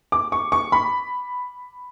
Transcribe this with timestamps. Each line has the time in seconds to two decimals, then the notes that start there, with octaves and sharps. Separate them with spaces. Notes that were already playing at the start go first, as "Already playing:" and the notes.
0.12 D6
0.32 C#6
0.52 C#6
0.72 B5